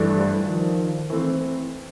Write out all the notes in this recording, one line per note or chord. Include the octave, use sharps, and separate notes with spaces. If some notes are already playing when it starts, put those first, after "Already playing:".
Already playing: G2 E3 A3 D4
F3 G3
D#3 F3
E3 A3 C4